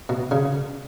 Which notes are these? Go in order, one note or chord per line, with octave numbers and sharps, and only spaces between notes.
B2
C#3